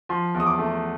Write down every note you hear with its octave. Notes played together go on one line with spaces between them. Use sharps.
F3 C6
E2
D#6
D6
A3